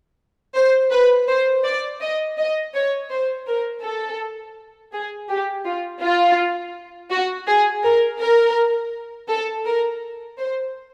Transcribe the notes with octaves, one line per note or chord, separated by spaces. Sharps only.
C5
B4
C5
D5
D#5
D#5
C#5
C5
A#4
A4
G#4
G4
F4
F4
F#4
G#4
A#4
A#4
A4
A#4
C5